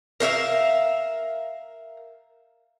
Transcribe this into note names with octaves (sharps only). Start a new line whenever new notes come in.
A#4 C5 E5 F5